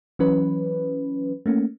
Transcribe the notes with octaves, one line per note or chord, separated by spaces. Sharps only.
E3 F#3 C#4 B4
A3 A#3 C#4